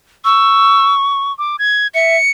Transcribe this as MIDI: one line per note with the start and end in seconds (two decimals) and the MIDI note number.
0.25 1.32 85
0.25 0.94 88
1.38 1.56 86
1.59 1.87 92
1.94 2.17 76
1.94 2.31 97